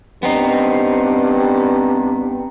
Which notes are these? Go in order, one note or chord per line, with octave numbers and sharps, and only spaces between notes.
G2 B3 C4 D#4